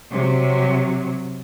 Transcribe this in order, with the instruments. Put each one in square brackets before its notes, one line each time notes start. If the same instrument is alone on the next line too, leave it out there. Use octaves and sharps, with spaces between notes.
[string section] C3 F#3